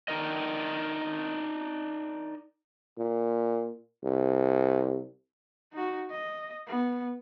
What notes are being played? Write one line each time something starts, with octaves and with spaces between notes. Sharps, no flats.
D4 D#4 A#4 D#5
A#2
C2
D#4 F#4
D#5
B3